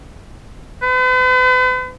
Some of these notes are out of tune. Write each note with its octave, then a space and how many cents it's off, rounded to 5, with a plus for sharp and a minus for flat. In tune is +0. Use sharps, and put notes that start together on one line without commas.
B4 +45